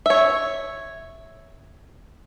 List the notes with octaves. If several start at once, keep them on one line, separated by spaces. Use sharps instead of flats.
C#5 E5